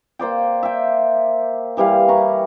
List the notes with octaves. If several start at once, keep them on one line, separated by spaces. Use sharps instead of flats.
A#3 C5 D5 G5
E5 G5
E3 G3 E4 F5
B4 A#5 C#6